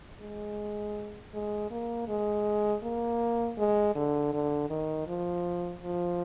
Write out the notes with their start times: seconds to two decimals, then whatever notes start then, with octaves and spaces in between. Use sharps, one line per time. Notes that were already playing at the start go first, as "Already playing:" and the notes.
0.21 G#3
1.34 G#3
1.71 A#3
2.08 G#3
2.83 A#3
3.58 G#3
3.95 D3
4.33 D3
4.70 D#3
5.08 F3
5.83 F3